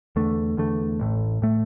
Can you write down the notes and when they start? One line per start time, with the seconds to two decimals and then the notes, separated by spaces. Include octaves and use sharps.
0.16 E2 D3 A3
0.57 E2 D3 A3
1.00 A1 A2 A3
1.42 A2 A3